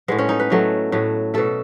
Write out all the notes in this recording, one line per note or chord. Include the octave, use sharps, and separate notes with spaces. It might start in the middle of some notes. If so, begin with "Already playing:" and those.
A2 G#3 B3
C#4
D#4
B4
A2 F#3 A3
A2 F#3 A3
B2 A3 A4